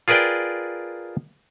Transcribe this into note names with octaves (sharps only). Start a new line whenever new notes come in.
F4 G#4 A#4 B4 D5 G5